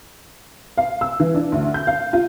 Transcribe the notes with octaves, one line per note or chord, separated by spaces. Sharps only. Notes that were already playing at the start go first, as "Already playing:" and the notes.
F5
E6
E3
D4
D2
G6
F5
F4